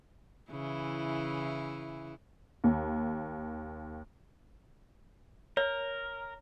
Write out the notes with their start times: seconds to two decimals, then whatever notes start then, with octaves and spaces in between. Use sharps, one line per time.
0.51 C#3 E3 E4
2.64 D#2
5.57 A#4 C#5